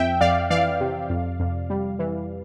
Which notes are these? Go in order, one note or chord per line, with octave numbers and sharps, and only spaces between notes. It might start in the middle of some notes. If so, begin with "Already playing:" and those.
Already playing: F2 E5 G5
F2 D5 F5
E3 D5 F5
C3
F2
F2
G3
E3